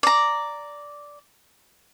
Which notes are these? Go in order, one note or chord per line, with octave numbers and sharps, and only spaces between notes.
D5 A#5